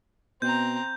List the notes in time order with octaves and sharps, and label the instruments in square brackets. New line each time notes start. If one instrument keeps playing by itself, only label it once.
[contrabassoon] B2 [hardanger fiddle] C4 A#5 [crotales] G6